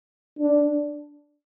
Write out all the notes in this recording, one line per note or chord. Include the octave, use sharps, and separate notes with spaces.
D4